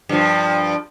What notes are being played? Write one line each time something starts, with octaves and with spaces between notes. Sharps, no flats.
G2 F3